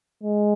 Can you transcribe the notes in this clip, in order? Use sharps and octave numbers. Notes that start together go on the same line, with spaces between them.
G#3